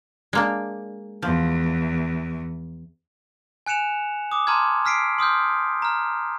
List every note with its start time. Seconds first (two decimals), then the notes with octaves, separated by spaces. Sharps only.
0.33 G#3 A#3 D4
1.22 E2 F3
3.66 G#5 F#6 C#7 E7 F7
4.31 D6 D#6
4.47 A5 A#5 C6 D6 F6 G#6
4.85 E6 F6 B6 C7 D7
5.18 C6 D#6 F6 G6
5.82 A#5 F6